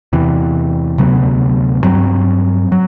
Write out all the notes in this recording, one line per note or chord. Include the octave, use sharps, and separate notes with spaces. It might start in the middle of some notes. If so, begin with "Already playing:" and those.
E2 C3 E3
D2 C3 F#3 B3
G2 F#3 C4
F#3